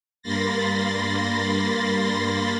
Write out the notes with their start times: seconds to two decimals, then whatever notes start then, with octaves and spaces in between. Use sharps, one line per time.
0.23 G2 A#3 B5 C6 A6 A#6